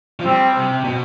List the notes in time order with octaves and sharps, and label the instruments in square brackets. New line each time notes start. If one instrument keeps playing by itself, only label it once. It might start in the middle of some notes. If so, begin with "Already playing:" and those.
[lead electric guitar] F3
[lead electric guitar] G3 [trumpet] C4
[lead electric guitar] C3
B2